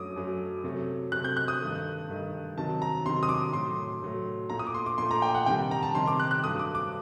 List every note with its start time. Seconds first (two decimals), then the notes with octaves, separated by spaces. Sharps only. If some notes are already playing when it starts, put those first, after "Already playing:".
Already playing: F#2 F#3 A3 D6 D#6
0.16 F#2 F#3 A3
0.64 C3 F#3 A3
1.12 C3 F#3 A3 F#6
1.24 G6
1.37 F#6
1.48 D#6
1.60 G2 D#3 A3
2.09 G2 D#3 A3
2.57 C3 D#3 F#3 A5
2.82 A#5
3.05 C3 D#3 F#3 C6
3.23 D#6
3.29 D6
3.53 A2 F#3 A3 C6
4.02 A2 F#3 A3
4.50 A#2 A3 A#5
4.59 D#6
4.67 D6
4.75 C6
4.86 D6
4.98 A#2 A3 C6
5.11 A#5
5.22 G5
5.35 F#5
5.46 C3 D#3 G3 G5
5.71 A#5
5.83 A5
5.95 C3 D#3 G3 C6
6.08 D6
6.20 F#6
6.31 F#6
6.43 G2 F#3 A3 D#6
6.59 D6
6.75 D6